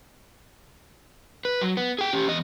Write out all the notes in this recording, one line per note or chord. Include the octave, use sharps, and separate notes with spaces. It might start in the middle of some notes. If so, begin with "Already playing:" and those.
B4
F#3
B3
G#4 G5
C#4 G4
E2 D#5